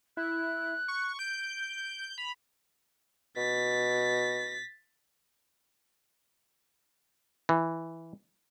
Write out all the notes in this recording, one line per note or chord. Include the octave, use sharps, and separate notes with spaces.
E4 F#6
C#6
G6 D7
B5 F7
B2 A6 B6
E3